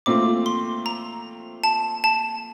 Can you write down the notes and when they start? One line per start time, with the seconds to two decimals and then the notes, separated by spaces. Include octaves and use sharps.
0.06 A#2 A3 C4 F4 D6
0.46 C6
0.86 A#5
1.64 A5
2.04 A5